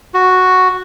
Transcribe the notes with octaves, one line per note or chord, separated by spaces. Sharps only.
F#4